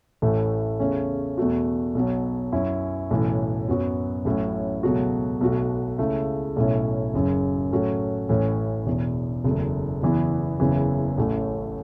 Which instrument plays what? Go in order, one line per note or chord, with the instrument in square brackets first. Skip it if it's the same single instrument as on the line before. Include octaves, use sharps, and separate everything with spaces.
[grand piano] A1 A2 E3 A3 E4
E2 C#3 A3 C#4
E2 B2 A3 F#4
B1 B2 F#3
F#2 F#3 C#4 E4
B1 A2 E3 C#4 E4
F#2 F#3 B3 F#4
A1 A2 F#3 C#4 E4
C#2 B2 F#3 A3 F#4
B1 B2 A3 F#4
C#2 C#3 A3 E4
B1 A2 A3 C#4 E4
F#1 F#2 C#3
A2 F#3 A3 C#4 F#4
A1 A2 E3 C#4
E1 E2 E3
F#1 E2 B2 A3
F#1 E2 E3 B3 E4
F#1 E2 C#3 E3 C#4
A1 A2 A3 C#4